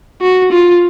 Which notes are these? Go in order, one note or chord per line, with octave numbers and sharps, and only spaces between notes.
F#4
F4